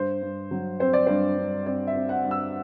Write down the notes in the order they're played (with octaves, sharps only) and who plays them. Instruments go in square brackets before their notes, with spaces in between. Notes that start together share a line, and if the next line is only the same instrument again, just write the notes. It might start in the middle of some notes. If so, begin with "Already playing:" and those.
Already playing: [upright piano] G2 C5
G2
F#3
C4 C5
D5
G2 C5
G2
C4 D5
E5
C4
F#5
G2
E6